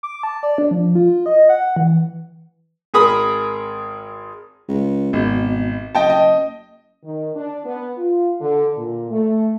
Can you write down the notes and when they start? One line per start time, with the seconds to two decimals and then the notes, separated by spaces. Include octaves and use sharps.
0.03 D6
0.23 A5
0.43 D5
0.58 D4
0.71 F3
0.95 F4
1.26 D#5
1.49 F#5
1.76 E3
2.94 G#1 G#4 A#4 B5 D#6
4.69 C#2
5.13 G#1 B2
5.95 F#1 D#5 G5 A5
6.10 D#5
7.04 D#3
7.36 D4
7.65 B3
7.98 F4
8.41 D3
8.78 A#2
9.11 A3